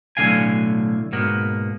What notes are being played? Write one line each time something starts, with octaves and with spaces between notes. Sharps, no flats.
B1 A2 D3 E3 F5 G#5
G#2 B2 A#3 B3